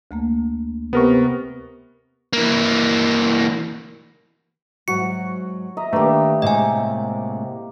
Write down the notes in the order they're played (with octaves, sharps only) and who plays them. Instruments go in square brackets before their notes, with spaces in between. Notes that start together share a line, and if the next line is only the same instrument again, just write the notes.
[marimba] D2 A3 A#3
[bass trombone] C3 [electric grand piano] B3 A#4 C#6
[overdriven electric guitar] E3 A#3
[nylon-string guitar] G#2 F#3 [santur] F#4 [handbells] C#7
[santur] D#5 E5 A#5
[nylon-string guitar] D#3 D4 B4 [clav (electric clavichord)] A3 [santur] A#3 G4
[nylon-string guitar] A2 C3 G#3 [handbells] D#5 G#5